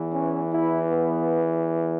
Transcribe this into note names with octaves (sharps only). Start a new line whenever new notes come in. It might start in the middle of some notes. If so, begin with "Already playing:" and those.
Already playing: E2 E3
C#4
E4
B3